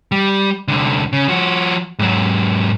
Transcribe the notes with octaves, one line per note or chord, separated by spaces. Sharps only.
G3
C2 D3
C#3
F3 F#4
G#2 F#3